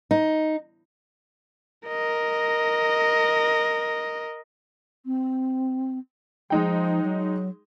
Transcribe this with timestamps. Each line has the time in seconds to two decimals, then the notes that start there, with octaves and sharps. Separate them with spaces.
0.11 D#4
1.88 A#4 D#5
5.05 C4
6.50 F3 G#3 D#4 G5
7.03 F#3